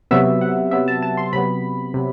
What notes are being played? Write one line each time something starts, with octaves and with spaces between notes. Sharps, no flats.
C3 F#3 B3 E5
F#5
C3 F#3 B3 E5
A5
A5
C6
C3 F#3 B3 B5
C3 F#3